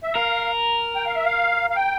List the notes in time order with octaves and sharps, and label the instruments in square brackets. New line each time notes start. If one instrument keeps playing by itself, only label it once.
[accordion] E5
[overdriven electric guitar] A#4 [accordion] F5
[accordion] G5
F5
E5
F5
F5
G5